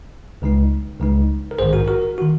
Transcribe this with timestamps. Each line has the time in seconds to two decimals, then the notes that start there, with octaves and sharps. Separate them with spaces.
0.42 C#2 C#3 G#3 D#4
1.00 C#2 C#3 G#3 D#4
1.51 A#4
1.58 A#1 G#2 D#3 G#4 C5
1.73 F#4 A#4
1.88 F#4 A#4
2.18 D#3 F#4